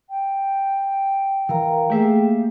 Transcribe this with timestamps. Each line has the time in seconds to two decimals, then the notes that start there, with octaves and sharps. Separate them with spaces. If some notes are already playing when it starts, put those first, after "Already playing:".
0.09 G5
1.49 E3 A#4 F5 A#5
1.90 A3 A#3 G4 G#4 E5 F5